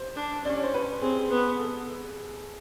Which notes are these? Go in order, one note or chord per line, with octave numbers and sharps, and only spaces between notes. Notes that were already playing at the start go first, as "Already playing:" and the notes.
Already playing: C5
D4
C#4 D5
C#5
C5
B4
C4 G#4
B3
A4